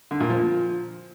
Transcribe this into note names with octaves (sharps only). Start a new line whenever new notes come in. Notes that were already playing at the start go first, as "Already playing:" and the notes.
D3
A#2
F3